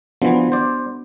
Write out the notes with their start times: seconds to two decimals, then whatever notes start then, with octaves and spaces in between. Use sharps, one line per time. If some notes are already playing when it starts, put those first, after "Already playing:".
0.22 E3 F3 B3 D4 F#4
0.52 C5 D5